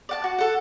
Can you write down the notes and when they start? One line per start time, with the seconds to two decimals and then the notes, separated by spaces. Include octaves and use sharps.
0.09 D5 F#5 A5
0.24 F#4
0.38 A4 F#5